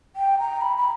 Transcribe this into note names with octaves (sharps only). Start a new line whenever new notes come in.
G5
A#5
B5
B5